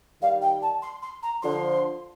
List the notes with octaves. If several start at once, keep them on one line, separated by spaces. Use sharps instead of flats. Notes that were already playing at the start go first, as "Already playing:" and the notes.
D#3 G3 F5
G5
A5
C6
C6
A#5
D3 F3 C6